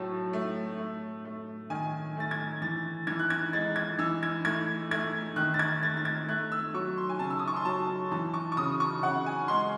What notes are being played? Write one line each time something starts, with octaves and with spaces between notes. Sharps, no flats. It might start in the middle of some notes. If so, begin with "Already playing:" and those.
Already playing: A2 F#3 A3 A5
A3
A3
A3
D#3 G#5
A3 A6
G#6
E3 A6
E3 G#6
F#6
G#6
G#3 A6
G#6
E3 E6
G#6
A3 G#6
A3 G#6
D#3 F#6
A6
G#6
A3 A6
A6
G#6
A3 F#6
E6
F#3 C#6
C6
G#5
C#3 A5
E6
D#6
C#6
C6
F#3 A5
E3 A5
C#6
C#6
C#3 D#6
C#6
C#3 F#5
G#5
G#3 C6